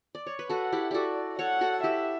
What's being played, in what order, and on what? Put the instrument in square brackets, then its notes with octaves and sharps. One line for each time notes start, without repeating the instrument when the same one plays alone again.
[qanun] D5
C#5
B4
[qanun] F#4 A4 [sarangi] F#5
[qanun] E4 G4
[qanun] F#4 G4 A4 [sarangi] D5
[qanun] A4 C#5 [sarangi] F#5
[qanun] F#4 A4
[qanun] E4 G4 [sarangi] E5